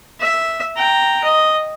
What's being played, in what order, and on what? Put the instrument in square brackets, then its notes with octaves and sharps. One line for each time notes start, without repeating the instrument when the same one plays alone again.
[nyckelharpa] E5
G5 A#5
D#5